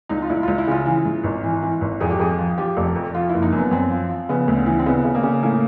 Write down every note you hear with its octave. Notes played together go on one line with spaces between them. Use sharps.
C#2 D#4
F4
C#2 E4
C#2 F4
E4
C#3 F4
E3
G#2
G#1
E3
E3
G#1
F2 G#4
G4
F2 G#4
F3
F3 G4
F1
F2
F3 F4
F#1 E4
D#4
F#2
B3
F#2 C4
F3
F3
C#3 B3
D2
E3
C4
C#3 B3
C#3
A#3
C#3
A2 A#3